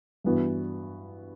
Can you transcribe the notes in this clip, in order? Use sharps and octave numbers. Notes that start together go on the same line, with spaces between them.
G2 E3 B3 F#4